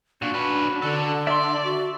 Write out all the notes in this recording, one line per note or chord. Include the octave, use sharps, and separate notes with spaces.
A#2 D4 F#4
C#4 B4
D3 A4 F#5
D5 E5 C6
F#4